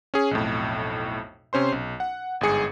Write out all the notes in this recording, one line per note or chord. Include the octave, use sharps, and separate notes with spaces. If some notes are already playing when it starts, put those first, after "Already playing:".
C#4 G#4
B1 F2 A2
C3 C#4 C5 C6
B1
F#5
G1 G#2 G#4 C#7